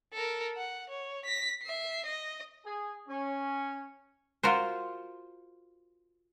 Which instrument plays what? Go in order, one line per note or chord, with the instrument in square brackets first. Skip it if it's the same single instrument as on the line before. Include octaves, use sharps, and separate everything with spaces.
[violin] A4 A#4
F#5
C#5
A#6 B6
E5 C7
D#5
[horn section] G#4
C#4
[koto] F4 F#4 A#4 C5